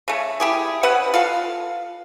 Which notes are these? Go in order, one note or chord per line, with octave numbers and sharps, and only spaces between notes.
C#3 A3
E4 G4 G#4
C3 C#4 B4 F#5
F4 A4 F5